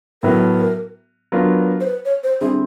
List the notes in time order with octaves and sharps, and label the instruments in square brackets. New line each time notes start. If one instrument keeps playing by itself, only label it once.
[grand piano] A2 F#3 B3 E4 A4 [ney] A#4
[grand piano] F#3 B3 D4 F4 A#4
[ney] C5
B4
C#5
C5
[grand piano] D3 G3 C4 E4 [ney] G#4